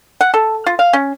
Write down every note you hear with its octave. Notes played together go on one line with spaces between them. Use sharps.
F#5
A4
F4
F5
C#4